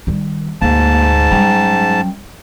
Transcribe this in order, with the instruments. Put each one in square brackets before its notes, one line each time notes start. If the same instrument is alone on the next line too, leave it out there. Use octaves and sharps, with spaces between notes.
[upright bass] D#3 G3
[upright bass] D2 [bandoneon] G#2 A5 [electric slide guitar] A#3
[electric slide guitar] F#2 G5 A#5 [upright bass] G3